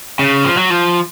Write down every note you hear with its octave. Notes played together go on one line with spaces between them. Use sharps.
C#3
F3
F#3
F3